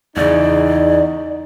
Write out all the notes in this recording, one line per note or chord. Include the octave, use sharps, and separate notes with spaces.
E2 C#3 D#4 D5